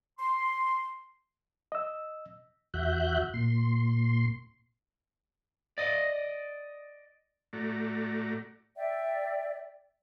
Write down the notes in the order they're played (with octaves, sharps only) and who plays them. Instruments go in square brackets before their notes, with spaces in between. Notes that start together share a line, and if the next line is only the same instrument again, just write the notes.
[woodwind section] C6
[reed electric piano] D#5 E6
[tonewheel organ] E2 F#4 E5 F#6 G6
A#2 C6
[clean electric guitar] D5 D#5
[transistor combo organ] A2 A3 F#4 D5 A#5
[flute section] D5 E5 G5